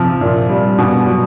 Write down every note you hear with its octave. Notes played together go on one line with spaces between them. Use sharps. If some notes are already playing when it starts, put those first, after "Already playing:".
Already playing: C3 F3
A#2
G3
B2
F#3